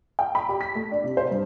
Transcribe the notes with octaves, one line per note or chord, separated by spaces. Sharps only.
G5
B5
G4
B6
A3
D4
C3
C5
G2